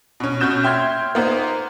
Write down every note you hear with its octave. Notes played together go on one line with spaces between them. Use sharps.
B2 C#4
B2 C#4 F#4 G6 E7
E5 G5 C6 F6 G#6
A#3 B3 D#4 C5